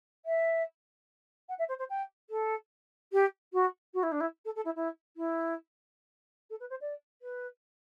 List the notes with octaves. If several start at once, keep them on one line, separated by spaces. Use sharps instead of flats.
E5
F#5
E5
C5
C5
G5
A4
G4
F#4
F#4
E4
D4
E4
A4
A4
E4
E4
E4
A4
B4
C5
D5
B4